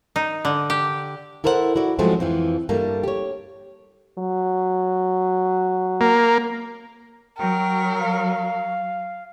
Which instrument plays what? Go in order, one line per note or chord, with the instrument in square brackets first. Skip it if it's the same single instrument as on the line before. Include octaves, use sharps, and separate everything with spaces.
[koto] D#4
D3
G4
[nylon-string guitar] E4 A4 A#4 C5 C#5 F#5
E4 F#4 D5
F3 F#3 G#3 A3 C4
F2 E3 F3
G2 G3 A3 A#3
G4 C#5
[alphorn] F#3
[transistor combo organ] A#3
[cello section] F#3 [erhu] A#4 [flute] G5
[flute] F5